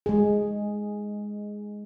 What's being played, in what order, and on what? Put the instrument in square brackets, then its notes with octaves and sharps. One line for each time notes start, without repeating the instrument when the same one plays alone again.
[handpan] G#3 G#4